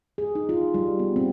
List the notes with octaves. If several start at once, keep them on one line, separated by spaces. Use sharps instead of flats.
G#4
D#4
F4
G3
B3
C4